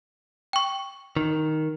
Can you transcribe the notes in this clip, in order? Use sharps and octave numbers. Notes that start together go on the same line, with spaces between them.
G5 C#6
D#3